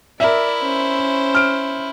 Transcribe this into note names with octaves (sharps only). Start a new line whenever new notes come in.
E4 A#4 D5 E5
C#4 C5
F6 D7